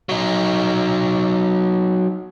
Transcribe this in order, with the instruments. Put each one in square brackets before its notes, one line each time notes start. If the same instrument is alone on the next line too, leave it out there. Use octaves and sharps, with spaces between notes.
[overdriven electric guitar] F#3 D#4